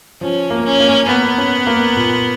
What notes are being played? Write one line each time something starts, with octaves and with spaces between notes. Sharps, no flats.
F3 C#4
A#3
C#4
A#3
A#3 B3
C#4
A#3
A#2